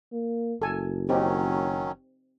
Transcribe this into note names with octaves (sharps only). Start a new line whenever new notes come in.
A#3
F#1 A4 G#5
D#3 F#3 C4 C#4 D#4 G4